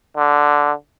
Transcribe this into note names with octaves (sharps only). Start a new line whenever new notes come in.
D3